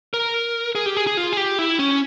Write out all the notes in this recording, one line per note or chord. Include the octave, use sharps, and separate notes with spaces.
A#4
G#4
G4
G#4
G#4
F4
G#4
G4
E4
C#4